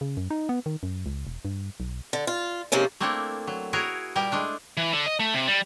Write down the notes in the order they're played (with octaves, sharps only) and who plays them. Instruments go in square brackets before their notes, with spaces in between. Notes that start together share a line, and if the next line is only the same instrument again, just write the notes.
[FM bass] C#3
F#2
D#4
B3
D#3
F#2
C#2
E1
G2
B1
[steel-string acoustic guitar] D3
F4
G#2 C3 F3 A#3 C#4
[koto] A3 A#3 C4 D4 E4 A4
F#3
E4 F#4 G#4 A#4 C#5
A#2 G3 G4 A#4 G5
G#3 A3 D4
[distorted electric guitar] E3
D3
D#5
A3
C3
G3